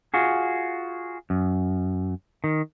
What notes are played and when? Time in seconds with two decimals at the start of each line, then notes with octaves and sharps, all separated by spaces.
0.14 F4 F#4 G#4
1.30 F#2
2.44 D#3